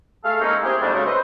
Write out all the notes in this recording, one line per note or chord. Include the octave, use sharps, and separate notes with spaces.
A3 G#4 A4 F5
G#3 A#3 C4 C#4 D#4 E4
C4 E4 G4 G#4
F2 G#2 G3 A3 A#3 D4
C#3 F#3 G#3 A3
B4 C5 D#5